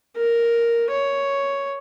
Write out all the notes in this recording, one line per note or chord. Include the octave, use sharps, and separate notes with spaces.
A#4
C#5